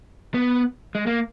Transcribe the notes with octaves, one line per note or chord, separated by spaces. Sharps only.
B3
G#3
A#3